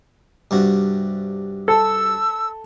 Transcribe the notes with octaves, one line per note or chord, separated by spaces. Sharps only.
G2 C3 F#4
A4 E6